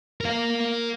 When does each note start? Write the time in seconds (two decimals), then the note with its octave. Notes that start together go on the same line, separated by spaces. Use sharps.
0.21 A#4 F5